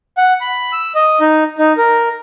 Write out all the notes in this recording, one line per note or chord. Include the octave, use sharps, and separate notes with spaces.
F#5
B5
E6
D#5
D#4
D#4
A#4